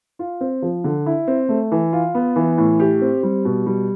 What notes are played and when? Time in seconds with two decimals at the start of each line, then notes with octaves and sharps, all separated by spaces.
0.19 F4
0.41 C4
0.62 F3
0.84 D3
1.06 E4
1.28 C4
1.49 A3
1.72 E3
1.93 F4
2.15 B3
2.36 E3
2.58 A2
2.80 G4
3.01 C4
3.23 G3
3.45 B2
3.66 G3